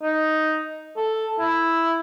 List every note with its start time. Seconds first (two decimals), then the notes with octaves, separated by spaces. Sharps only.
0.02 D#4
0.97 A4
1.39 E4